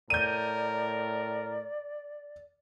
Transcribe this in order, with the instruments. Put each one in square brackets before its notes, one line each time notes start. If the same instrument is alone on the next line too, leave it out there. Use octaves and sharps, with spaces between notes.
[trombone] A2 [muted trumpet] A#4 [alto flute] D5 [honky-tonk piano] G6 D#7